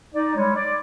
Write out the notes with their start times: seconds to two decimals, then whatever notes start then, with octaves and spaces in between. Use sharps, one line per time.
0.15 D#4 D5
0.36 G3 G#3 C#5
0.55 D5